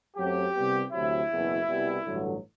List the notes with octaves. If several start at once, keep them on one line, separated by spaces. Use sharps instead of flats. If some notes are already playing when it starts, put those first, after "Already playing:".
F#2 F#3 A3 C4 G4
C2 C3 G3 B3
D2 C3 F#3 E4
F#1 E2 B2
C2 B2 G3
A1 G2 D3 F#3